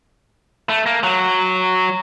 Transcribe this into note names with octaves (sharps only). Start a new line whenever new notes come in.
A3
A#3
F#3